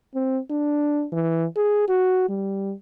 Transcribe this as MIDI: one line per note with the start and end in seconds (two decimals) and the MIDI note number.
0.15 0.39 60
0.50 1.05 62
1.12 1.45 52
1.56 1.84 68
1.89 2.27 66
2.29 2.74 55